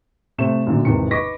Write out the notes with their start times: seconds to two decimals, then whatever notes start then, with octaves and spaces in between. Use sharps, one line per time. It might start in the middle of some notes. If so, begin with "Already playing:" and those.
0.38 C3 A3 C5 E7
0.67 F#2 A#2 D3
0.85 G#1 E2 C3 C#7
1.11 B4 D#5 C#6 D6 A#6 B6